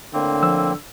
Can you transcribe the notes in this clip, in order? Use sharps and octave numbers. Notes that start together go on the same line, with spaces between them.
A2 D3 A#3 C4
F3 E6